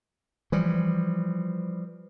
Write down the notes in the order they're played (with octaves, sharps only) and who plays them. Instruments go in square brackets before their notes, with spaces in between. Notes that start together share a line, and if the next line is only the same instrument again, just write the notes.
[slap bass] E3 F3 G3